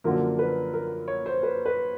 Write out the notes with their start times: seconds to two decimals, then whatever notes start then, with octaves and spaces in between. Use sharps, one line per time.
0.04 F#2 D3 F3 A#3 A#4
0.39 B4
0.74 A#4
1.08 C#5
1.26 C5
1.43 B4
1.66 B4